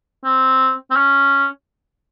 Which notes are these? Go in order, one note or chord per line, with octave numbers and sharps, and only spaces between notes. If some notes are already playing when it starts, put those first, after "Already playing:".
C4
C4
C#4